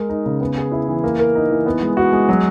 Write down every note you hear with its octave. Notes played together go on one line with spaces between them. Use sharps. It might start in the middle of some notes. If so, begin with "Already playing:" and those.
Already playing: G#3 A#4
D#4
C#3
B3
G#4
E4
E3
A#3
A#4
D#4
E3
B3
G#3
F#4
G#3
F#3